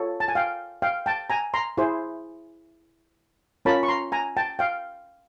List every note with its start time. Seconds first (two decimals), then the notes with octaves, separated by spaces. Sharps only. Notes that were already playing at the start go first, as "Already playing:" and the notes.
Already playing: F4 A4 C#5
0.20 A5
0.28 G#5
0.35 F5 G5
0.82 F5 G5
1.06 G5 A5
1.30 G#5 A#5
1.54 A#5 C6
1.77 E4 G#4 C5
3.65 C#4 F4 A#4 C#5 A5 B5
3.83 C#6
3.88 A#5 C6
4.12 G#5 A#5
4.37 G5 A5
4.59 F5 G5